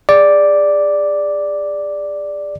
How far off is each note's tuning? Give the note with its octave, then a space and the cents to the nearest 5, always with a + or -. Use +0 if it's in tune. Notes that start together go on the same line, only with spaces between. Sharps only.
G#4 -25 D5 +0